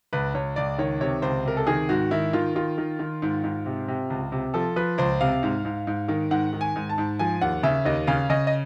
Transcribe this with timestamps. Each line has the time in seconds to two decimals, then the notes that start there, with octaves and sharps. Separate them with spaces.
0.13 C#2 B4
0.34 C#2 C#5
0.56 C#2 D5
0.78 D#3 C#5
1.01 C3 C#5
1.22 C#2 C5
1.45 C3 A#4
1.57 A4
1.67 D#3 G#4
1.89 G#2 F#4
2.11 D#3 E4
2.33 D#3 F4
2.55 D#3 F4
2.78 D#3
2.99 D#3
3.22 G#2
3.44 G#2
3.66 C3
3.88 C3
4.10 C#2
4.32 C3
4.54 F3 A4
4.76 F3 B4
4.98 C#2 C5
5.21 C3 F5
5.43 G#2
5.65 G#2
5.87 G#2
6.08 D#3
6.31 G#2 F#5
6.53 D#3
6.61 G#5
6.76 G#2
6.89 A5
6.98 G#2
7.19 F3 G#5
7.41 D#2 F#5
7.63 C#3 E5
7.85 D#2 D#5
8.07 C#3 F5
8.30 C#3 D#5
8.47 D#5